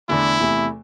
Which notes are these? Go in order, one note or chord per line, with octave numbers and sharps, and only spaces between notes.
E2 D3 A3 D4 E4
E2 C3 A3